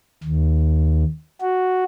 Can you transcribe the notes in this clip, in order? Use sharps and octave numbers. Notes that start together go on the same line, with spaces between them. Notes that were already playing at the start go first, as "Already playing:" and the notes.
D#2
F#4